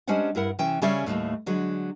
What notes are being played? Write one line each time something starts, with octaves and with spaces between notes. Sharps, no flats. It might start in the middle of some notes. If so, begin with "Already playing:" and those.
G3 G#3 C#4 D4 C5 F#5
G2 E4 A#4 F#5
C3 E3 C#4 G5
C#3 G3 C#4 A4 D5 E5
D#2 A2 A3 A#3
D3 F#3 G#3